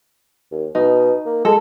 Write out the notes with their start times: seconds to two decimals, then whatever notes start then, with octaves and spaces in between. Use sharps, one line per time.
0.52 D#2
0.75 B2 D#4
1.26 A#3
1.45 G#3 A4